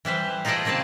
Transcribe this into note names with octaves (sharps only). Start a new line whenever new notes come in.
E3 G3 B4 C5
D#4 F4 G#4 A4 D5 D#5
C#3 A#3 C4 G#4 A5